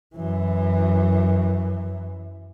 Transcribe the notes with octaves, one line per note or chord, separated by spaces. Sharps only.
F#2 E3